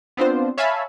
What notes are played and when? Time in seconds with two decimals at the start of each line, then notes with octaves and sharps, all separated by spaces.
0.17 B3 C4 D4 F4 C5
0.58 C#5 E5 F5 G#5 A5 B5